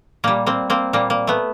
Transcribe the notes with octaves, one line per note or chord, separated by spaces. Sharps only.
A#2 G3 A#3
A#3 C4
A#3 C4
A#2 G3 A#3
A#3
A3 B3